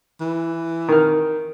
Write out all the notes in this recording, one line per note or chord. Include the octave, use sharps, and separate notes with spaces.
E3
D#3 F6